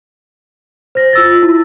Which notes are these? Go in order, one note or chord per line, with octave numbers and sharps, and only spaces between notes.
C5 A#6
F4 E6 A6
E4